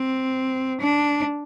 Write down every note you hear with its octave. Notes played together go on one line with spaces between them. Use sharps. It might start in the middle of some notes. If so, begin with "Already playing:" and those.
Already playing: C4
D4